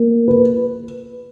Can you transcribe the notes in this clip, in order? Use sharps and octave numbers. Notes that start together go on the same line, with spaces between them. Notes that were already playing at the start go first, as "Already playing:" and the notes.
Already playing: A#3
B4